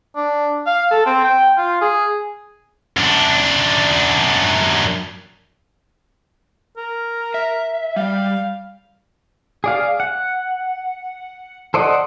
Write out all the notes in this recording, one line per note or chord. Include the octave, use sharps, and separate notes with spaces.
D4
F5
A4
C4
G5
F4
G#4
F#2 D4
A#4
E5
G3 F5
G#4 D5 F5
F#5
A4 C5 D5 D#5 F#5